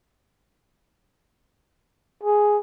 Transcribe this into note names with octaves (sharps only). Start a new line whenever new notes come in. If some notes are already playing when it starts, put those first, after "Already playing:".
G#4